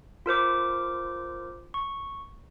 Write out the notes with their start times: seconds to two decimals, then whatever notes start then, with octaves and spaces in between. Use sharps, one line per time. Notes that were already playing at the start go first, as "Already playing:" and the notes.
0.26 F4 A#4 C5 D6
1.74 C#6